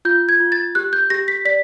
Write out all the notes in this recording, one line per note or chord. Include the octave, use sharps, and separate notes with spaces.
F4 G6
G#6
F4
A6
G4 F#6
G6
G4 A#6
B6
D5 B6